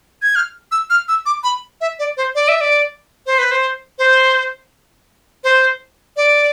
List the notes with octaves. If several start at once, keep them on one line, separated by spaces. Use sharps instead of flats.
G#6
F6
E6
F6
E6
D6
B5
E5
D5
C5
D5
E5
D5
C5
B4
C5
C5
C5
D5